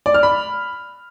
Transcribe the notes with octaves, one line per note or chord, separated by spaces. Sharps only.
D5
F6
B5